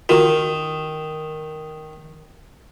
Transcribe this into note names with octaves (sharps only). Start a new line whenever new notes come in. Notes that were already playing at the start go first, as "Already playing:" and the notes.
D#3 F4 F#4 A#4